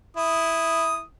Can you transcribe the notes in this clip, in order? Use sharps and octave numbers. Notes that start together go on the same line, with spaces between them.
E4 D#6